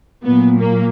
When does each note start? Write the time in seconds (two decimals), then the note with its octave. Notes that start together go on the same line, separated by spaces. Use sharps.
0.24 A#2 F#3 B3
0.59 A#3